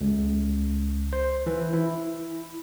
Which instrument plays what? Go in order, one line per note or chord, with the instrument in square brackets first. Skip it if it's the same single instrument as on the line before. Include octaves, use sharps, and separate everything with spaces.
[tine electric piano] C#2
C5
E3
E4